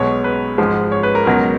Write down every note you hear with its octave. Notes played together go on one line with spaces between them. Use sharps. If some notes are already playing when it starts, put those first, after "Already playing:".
Already playing: B1 B2 G#3 C#5
B4
G#1 G#2 F3 G#3
C#5
B4
A#4
C#2 B2 F#3 A#4